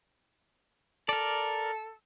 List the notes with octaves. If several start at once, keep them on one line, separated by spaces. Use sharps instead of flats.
A4 A#4 D5